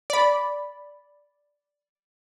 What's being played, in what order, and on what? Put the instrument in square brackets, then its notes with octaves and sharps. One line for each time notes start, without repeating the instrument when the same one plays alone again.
[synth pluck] D5 B5